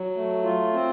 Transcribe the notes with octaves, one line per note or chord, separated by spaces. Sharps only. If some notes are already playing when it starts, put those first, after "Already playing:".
Already playing: F#3
A3
F4
C4